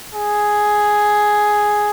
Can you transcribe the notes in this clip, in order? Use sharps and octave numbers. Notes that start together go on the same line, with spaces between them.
G#4